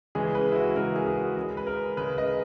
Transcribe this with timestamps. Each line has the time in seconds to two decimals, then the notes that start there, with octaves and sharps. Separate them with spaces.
0.15 C#3 E3 G#3 G#4
0.35 B4
0.52 E4
0.56 F#4
0.76 C#3 E3 G#3 A#4
0.96 G#4
1.07 G#4
1.17 F#4
1.36 C#3 G#3 G#4
1.57 B4
1.67 A#4
1.97 C#3 G#3 B4
2.18 D#5